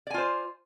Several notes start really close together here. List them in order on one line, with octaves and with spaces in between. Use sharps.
D5 G#5 F4 C5